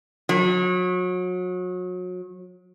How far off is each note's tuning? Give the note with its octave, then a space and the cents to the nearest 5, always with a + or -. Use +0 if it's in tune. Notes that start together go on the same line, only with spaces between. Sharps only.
F#3 -30